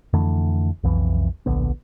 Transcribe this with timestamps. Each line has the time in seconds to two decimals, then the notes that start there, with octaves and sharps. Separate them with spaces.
0.13 F2 D3 E3 A3
0.83 B1 F2 E3
1.46 D1 A#1 D3 B3